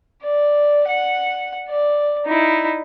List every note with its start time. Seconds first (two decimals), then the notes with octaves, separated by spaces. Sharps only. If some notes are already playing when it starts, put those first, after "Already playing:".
0.23 D5
0.88 F#5
1.69 D5
2.26 D#4 E4